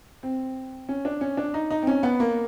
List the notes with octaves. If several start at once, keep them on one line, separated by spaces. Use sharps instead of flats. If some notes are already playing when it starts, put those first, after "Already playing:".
C4
C#4
D4
C#4
D4
D#4
D#4
C4
C#4
B3
A#3